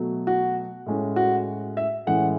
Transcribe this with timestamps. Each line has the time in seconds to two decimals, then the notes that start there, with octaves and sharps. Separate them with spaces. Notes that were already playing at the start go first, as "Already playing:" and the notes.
Already playing: B2 F#3 A3
0.27 F#4
0.86 A2 G#3 C#4
1.16 F#4
1.77 E5
2.07 A2 E3 G#3 C#4 F#5